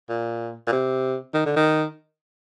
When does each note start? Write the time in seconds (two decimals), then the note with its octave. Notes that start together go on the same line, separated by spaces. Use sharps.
0.09 A#2
0.67 A#2
0.72 C3
1.34 D#3
1.46 D3
1.56 D#3